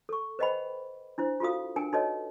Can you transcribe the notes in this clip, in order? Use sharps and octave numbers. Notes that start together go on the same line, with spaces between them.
A4 C#6
B4 C5 D#5 F#5 G5 B5
D4 E4 C5
F4 F#4 A4 F5 D#6
D4 A#4 G5 G#5
D#4 F#4 A4 B4 C#5 D#5